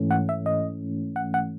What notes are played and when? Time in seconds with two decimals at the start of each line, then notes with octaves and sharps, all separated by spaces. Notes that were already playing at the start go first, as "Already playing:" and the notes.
Already playing: G#2 E3 A3 C#4
0.11 F#5
0.29 E5
0.46 D#5
1.16 F#5
1.34 F#5